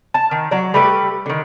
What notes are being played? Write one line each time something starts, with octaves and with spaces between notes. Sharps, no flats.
A5
D#3
F#3 D5
G3 A3 G4 B4
D3 D#3